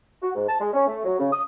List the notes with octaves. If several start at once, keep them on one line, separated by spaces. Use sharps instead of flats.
F#4
G#2
A5
G#3
C#4
A3
F#3
C#3
D#6